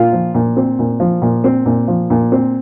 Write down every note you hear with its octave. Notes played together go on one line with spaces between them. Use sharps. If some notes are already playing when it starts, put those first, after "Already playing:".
Already playing: A#2 F4
F3
A#2
C4
A#2
F3
A#2
C4
A#2
F3
A#2
C4